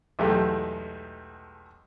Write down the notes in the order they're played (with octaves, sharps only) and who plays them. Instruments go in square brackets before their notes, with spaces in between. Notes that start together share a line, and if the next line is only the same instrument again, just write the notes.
[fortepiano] B1 E2 G#3 A3 G4